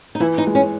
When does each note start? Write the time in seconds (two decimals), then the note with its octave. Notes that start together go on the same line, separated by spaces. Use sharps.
0.15 D#4
0.20 E3 E4
0.38 D#4
0.47 G#3
0.55 C#4